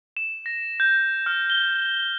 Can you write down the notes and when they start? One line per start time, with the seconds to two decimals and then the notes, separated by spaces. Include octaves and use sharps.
0.17 E7
0.46 A#6
0.80 G6
1.26 F6
1.50 G7